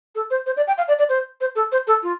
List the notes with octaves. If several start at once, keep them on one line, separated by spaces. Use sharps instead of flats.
A4
C5
C5
D5
G5
F5
D5
D5
C5
C5
A4
C5
A4
F4